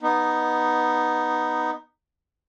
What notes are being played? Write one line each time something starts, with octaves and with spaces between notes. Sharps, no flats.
B3 D#4